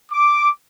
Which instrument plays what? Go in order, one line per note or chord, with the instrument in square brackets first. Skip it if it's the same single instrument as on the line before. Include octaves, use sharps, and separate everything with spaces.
[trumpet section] D6